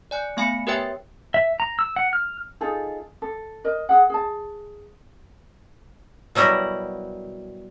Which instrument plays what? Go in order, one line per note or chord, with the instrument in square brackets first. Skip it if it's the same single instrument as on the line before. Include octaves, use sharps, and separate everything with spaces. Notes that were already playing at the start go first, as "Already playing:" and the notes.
[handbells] D5 G#5 F#6
A3 B3 F5 G#5 B5 C#7
G4 A#4 B4 C#5 E5 G5
[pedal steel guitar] E5
A#5
E6
F#5
F6
[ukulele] D#4 F4 G#4 A4
A4
A#4 D#5
G#4 F#5
G#4 A5
[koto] B2 F#3 G3 E4 A#4